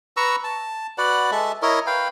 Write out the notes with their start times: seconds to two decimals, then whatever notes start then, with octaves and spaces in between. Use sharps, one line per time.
0.17 B4 A#5 C#6 E6
0.44 A5
0.98 F#4 B4 D5 F#5
1.32 G#3 A4 E5
1.62 E4 A#4 C#5 D#5
1.86 B4 F5 G5